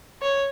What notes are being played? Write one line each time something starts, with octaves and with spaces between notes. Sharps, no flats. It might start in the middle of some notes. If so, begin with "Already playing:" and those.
C#5